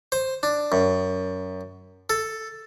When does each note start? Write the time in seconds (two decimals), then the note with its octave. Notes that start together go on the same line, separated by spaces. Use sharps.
0.12 C5
0.43 D4
0.72 F#2
2.10 A4